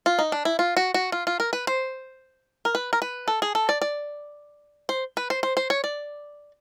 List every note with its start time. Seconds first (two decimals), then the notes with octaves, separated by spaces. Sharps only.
0.06 F4
0.19 D#4
0.32 D4
0.45 E4
0.59 F4
0.77 F#4
0.94 F#4
1.12 F4
1.27 F4
1.40 A#4
1.53 B4
1.67 C5
2.65 A#4
2.75 B4
2.93 A#4
3.02 B4
3.28 A4
3.42 G#4
3.55 A4
3.69 D5
3.82 D5
4.89 C5
5.17 B4
5.30 C5
5.43 C5
5.57 C5
5.70 C#5
5.84 D5